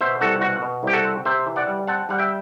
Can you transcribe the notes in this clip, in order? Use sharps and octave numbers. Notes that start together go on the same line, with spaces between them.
B2 C5 E5
C2 F#4 A4
B2 F#4
B2
C2 G4
F#4 A4
C4
C3 C5 E5
E3
D5 F#5
G3
C4 F#5 A5
G3 F#5
E5 G5